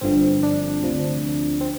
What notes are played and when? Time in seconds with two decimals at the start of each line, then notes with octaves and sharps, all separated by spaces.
0.01 G1 G2 D3 F3 C4
0.43 D4
0.83 D2 C3 F3
1.61 C4